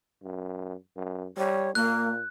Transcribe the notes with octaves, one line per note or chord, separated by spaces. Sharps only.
F#2
F#2
G3 C#5
A#2 A#3 F#6